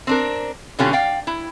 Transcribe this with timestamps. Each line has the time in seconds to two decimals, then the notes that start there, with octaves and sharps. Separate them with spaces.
0.07 C4 D4 A#4
0.79 B2 D3 F#3 C#4 F4 G4
0.93 D5 F5 G5
1.27 E4